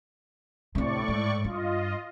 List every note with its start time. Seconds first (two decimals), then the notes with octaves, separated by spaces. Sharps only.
0.75 D2 A2 C3 D5 C#6
1.08 G#2
1.44 G2 F4 D#5